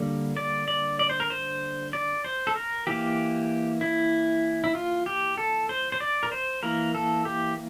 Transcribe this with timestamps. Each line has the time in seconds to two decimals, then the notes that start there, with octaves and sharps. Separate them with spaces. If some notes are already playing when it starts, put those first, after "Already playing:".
Already playing: D3 G3 A#3
0.37 D5
0.68 D5
0.99 D5
1.10 C5
1.20 A#4
1.30 C5
1.93 D5
2.25 C5
2.47 A4
2.56 A#4
2.87 E3 A#3 G4
3.81 E4
4.64 E4
4.75 F4
5.06 G4
5.38 A4
5.69 C5
5.92 C5
6.00 D5
6.23 A#4
6.32 C5
6.63 E3 A#3 A#4
6.95 A4
7.25 G4